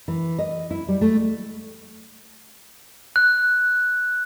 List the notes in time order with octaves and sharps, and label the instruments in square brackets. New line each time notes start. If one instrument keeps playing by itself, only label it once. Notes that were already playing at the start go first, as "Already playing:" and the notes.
[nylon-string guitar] E3
D#5
E4
G3
A3
[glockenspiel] F#6